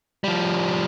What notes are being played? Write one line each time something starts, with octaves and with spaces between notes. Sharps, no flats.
F3 G3